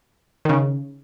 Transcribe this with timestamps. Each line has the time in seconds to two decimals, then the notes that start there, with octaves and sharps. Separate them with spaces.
0.45 D#3
0.49 C#3